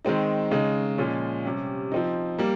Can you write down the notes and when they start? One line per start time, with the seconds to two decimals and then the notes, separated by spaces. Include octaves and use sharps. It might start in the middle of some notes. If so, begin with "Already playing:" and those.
0.05 D#3 G#3 C4 D#4
0.51 C#3 G#3 D#4
0.98 A#2 F3 G#3 C#4
1.45 C3 G3 C#4
1.92 F3 C4 D#4
2.39 G3 A#3